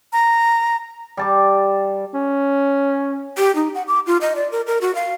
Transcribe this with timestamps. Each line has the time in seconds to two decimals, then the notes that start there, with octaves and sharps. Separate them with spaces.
0.13 A#5
1.17 G3 A5 D6
2.14 C#4
3.37 G4
3.55 D#4
3.75 F#5
3.87 D6
4.06 F4
4.21 D#5
4.35 D5
4.51 A#4
4.67 A#4
4.81 F#4
4.95 F5